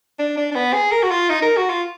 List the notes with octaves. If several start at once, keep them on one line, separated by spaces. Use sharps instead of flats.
D4
D4
D4
B3
G#4
A#4
F#4
F4
D#4
A#4
F#4
F4